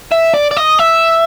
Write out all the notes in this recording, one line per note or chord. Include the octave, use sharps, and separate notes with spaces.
E5
D5
D5
D#5
E5